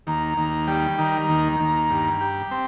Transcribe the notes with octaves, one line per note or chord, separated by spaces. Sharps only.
D#2 A#5
D#2
G3
D#3 A#5
D#2
D#2
G2
G4
C4